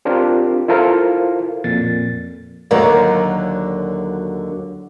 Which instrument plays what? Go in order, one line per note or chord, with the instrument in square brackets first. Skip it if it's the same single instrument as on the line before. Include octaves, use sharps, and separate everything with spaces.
[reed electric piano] C4 D4 F4 G4 A#4
E4 F4 A4 A#4 C5 F5
F2 A#2 A6
[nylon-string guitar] D#2 D3 F#3 A#4 D5